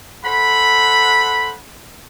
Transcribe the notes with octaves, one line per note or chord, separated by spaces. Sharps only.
A4 C5 F#5 B5